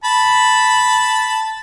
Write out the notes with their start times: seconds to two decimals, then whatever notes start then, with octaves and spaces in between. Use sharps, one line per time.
0.04 A5 B5